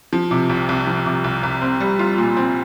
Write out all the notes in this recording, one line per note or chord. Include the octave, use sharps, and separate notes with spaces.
F3
C3
C2
C2
F3
C3
C2
C2
C4
G3
F4
A#2
C4